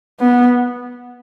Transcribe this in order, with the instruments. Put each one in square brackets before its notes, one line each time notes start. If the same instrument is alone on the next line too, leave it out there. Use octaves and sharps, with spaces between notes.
[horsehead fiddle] B3